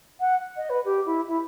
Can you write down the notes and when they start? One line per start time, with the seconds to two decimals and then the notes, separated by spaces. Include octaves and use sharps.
0.20 F#5
0.56 D#5
0.69 B4
0.85 G4
1.05 E4
1.27 E4